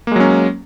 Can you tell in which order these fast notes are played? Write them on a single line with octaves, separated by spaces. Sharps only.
A#3 G#3 F#3 C#4